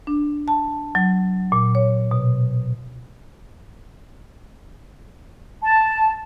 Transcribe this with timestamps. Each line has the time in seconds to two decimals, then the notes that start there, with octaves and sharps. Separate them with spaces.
0.07 D4
0.48 A5
0.95 F#3
1.52 A#2
1.75 C#5
2.11 B2
5.63 A5